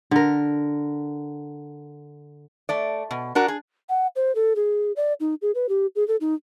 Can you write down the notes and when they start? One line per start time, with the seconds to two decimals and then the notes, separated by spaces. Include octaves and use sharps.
0.11 D3 A#4
2.69 A3 D5
3.11 B2
3.35 D4 F#4 A#4
3.48 G#4
3.89 F#5
4.16 C5
4.35 A4
4.56 G#4
4.96 D5
5.20 D#4
5.42 G#4
5.55 B4
5.69 G4
5.96 G#4
6.08 A4
6.21 D#4